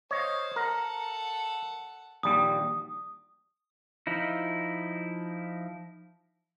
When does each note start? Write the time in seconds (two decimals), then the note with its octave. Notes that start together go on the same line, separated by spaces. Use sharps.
0.11 C5 C#5 D#5 F5
0.56 A4 A#4 F#5
2.23 A#1 D#2 G3 D#6
4.07 F3 D#4 E4